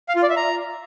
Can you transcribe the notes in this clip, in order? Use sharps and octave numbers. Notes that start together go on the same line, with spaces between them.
F5
F4
D5
E5
A#5